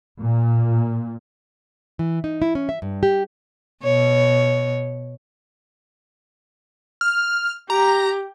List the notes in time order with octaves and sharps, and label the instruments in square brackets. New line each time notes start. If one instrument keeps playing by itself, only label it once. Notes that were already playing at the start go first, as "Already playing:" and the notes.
[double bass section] A#2
[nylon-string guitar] E3
D#4
E4
C#4
E5
G2
G4
[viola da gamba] B2 C#5
[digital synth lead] F6
[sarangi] G4 [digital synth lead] A#5